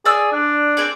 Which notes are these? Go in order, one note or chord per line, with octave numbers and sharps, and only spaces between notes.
G#4 D5 E6
D4
C4 G#4 D5